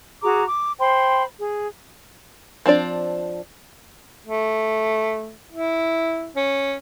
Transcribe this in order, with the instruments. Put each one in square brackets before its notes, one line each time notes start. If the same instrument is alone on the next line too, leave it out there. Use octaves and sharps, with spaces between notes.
[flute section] F#4 G#4 A#5 D6
D6
C5 G5 B5 C6
G#4
[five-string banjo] F3 C4 D4 D5
[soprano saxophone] A3
E4
C#4